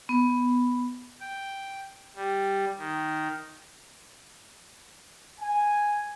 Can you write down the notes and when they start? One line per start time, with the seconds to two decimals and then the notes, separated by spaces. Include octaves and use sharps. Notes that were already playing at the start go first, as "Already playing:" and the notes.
0.09 B3
1.20 G5
2.16 G3
2.78 D#3
5.40 G#5